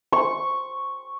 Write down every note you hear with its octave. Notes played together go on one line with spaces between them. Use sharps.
C#6